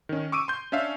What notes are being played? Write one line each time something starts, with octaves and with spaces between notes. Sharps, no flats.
D#3 C#4
C#6 D6 E6 D7 D#7
C6 G6
C#4 D4 E5 F5